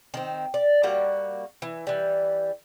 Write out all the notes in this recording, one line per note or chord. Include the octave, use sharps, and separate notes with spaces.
D#3 C4
D5
G3 A#3 F#4
E3
E3 G3